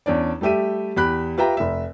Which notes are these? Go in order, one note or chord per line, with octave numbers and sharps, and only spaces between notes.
E2 C#4 D4 D5
G3 A3 G4 E5 D#7
E2 G4 B5 F#6
F4 G4 B4 E5 G5 A#5
F1 E5